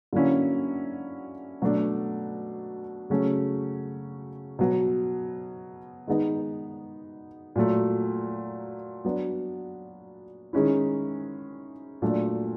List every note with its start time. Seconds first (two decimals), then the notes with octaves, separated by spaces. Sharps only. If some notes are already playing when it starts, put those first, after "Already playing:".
0.13 D3 F#3 A#3 C#4 E4
1.62 B2 F#3 A3 D4
3.10 C#3 F#3 A3 C#4
4.59 B2 F#3 B3
6.07 D#3 G#3 B3 D#4
7.56 A#2 F#3 A3
9.05 F#3 B3 D4
10.53 D#3 G#3 C#4 E4
12.02 A#2 F#3 A3 D4